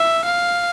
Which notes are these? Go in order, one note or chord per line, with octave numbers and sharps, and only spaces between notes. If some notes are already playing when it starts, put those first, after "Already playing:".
Already playing: E5
F5